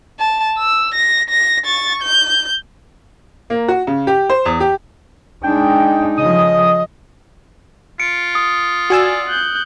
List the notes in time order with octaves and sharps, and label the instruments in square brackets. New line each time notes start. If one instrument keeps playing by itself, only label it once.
[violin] A5
E6
A#6
A#6
C#6 A6
G6
[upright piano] A#3
F#4
C#3
G4
C5
E2
G4
[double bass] G#3 D4 [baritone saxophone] D#4 [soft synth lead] G5
[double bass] C#3 F3 [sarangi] D#5 [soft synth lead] D#6
[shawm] F4 [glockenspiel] C#7 D7
[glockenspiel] D#6
[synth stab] F#4 G#5 E6 [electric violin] D5
[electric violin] F#6 G6